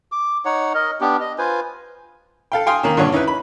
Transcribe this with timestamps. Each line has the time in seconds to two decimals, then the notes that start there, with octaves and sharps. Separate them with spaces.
0.12 D6
0.45 D#4 C#5 F#5
0.74 A#4 D#5
1.01 B3 D4 G4
1.20 D#5
1.38 F4 B4 C5 G#5
2.52 A4 F5 G5
2.66 F5 G5 G#5 C6 D#6 F6
2.83 D#3 A#3 C#4
2.97 G2 A#2 D3 C#5 F#5
3.12 C#4 D#4 E4 B4
3.28 B5